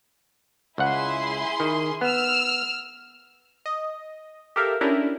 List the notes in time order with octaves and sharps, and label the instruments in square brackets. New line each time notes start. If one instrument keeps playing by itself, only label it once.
[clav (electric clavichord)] C#2 F#5 [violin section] E4 G#4 C6
[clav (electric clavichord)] D#3
[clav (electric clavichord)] B3 [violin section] E6 F6
[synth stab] D#5
G4 A4 A#4 E5 F5
C#4 D4 E4 G4 A#4